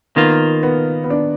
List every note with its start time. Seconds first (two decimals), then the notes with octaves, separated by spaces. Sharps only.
0.16 D#3 A#3 B3 F4
0.63 B3
1.04 B3
1.10 D4